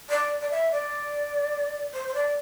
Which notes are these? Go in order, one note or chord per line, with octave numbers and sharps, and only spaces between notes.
D5
D5
E5
D5
C5
C5
D5